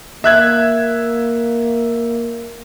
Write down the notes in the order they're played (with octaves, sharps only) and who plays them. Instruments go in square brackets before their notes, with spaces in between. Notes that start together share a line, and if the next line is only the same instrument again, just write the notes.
[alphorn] A#3 [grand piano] E5 F#6 G#6